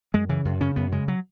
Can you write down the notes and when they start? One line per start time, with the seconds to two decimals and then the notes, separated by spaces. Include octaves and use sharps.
0.14 F#2 G#3
0.29 C#3 E3
0.45 F#2
0.61 C#3 C#4
0.76 F#2 B3
0.92 C#3 G#3
1.08 F#3